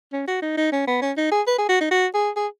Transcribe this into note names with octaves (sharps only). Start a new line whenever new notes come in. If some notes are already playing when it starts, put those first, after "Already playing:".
C#4
F#4
D#4
D#4
C#4
B3
C#4
D#4
G#4
B4
G#4
F#4
D#4
F#4
G#4
G#4